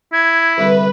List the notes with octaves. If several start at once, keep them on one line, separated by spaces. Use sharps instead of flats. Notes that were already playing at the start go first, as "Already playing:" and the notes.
E4 G#6
C2 D3 B4 E5